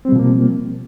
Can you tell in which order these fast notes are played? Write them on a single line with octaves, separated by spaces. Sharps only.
C4 G3 B2 F3 A#3